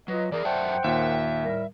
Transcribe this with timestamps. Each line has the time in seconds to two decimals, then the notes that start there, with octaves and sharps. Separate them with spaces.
0.08 F#3 F4 B4 D#5
0.32 E3 G#4 A#4 D5
0.45 F#2 C5 E5 F#5 G5 A5
0.84 D#2 A#2 E5
1.43 A2 G3 A#4